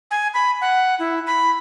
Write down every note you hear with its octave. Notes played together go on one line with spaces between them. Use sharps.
G#5
B5
F#5
E4
B5